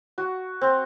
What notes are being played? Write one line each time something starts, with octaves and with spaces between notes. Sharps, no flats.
F#4
C4